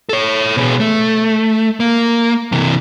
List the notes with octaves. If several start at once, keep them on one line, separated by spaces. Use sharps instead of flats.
A4 C#5
B2 G#4
A3
A#3
C3 E3